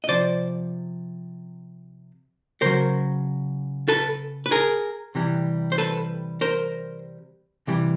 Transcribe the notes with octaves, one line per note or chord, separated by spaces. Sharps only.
D#5
C3 F3 C5 D5
C#3 F#3 A#4 C5
A4 B4
B4
G#4 A#4
C3 E3 G3
C5
A4 B4
A#4 C5
C3 E3 G3